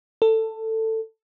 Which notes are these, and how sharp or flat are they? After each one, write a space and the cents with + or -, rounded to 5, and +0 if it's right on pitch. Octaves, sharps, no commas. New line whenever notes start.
A4 +15